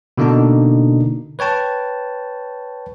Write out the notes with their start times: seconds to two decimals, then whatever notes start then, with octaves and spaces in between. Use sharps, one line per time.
0.18 B2 D3 A#3 D4 D#4
1.39 B4 C#5 G5 A5